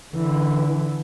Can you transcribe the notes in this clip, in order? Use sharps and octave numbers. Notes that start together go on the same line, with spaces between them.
D3 E3